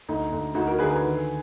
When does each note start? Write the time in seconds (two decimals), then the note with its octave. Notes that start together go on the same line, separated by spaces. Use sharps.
0.08 D2 D#4
0.32 D2
0.55 D2 D#4 F#4
0.67 F#4 A#4
0.79 D3 G#4 B4
0.90 G#4 B4
1.03 D#3